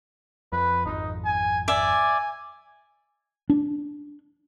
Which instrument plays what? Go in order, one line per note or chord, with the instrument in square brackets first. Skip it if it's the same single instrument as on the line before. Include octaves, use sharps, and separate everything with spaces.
[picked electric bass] F2 [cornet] B4
[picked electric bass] G#1 F2 [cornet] D#4
[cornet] G#5
[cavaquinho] D5 E5 [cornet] G#5
[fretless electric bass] D4